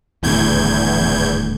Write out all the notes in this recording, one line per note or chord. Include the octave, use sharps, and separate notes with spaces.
D#1 E2 A2 D3 G6 G#6